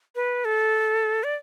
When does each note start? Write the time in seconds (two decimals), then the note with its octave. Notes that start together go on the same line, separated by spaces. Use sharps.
0.15 B4
0.45 A4
1.24 D5